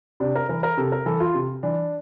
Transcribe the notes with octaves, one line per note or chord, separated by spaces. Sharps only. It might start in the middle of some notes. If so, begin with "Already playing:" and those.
C3 D4
A#4
E3 A#4
A#4
C3 A4
A#4
E3 A4
F4
C3
E3 D4